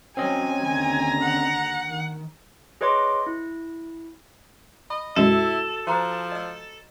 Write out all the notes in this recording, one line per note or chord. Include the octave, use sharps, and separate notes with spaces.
F#3 C4 C#4 D#5 G#5
D#2 D3 A#5
F#5
D#3
G#4 B4 C#5 D#5 C6 D6
E4
D#5 B5
B1 F#2 G#3 E4 F#4 A4 E5
F3 C5 A#5 C6
D#5 E6